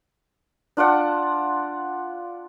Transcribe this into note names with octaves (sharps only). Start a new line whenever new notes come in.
D4 F4 D5 F#5